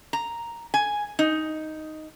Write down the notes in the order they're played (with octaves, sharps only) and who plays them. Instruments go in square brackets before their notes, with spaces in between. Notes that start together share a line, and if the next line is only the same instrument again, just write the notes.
[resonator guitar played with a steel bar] A#5
G#5
D#4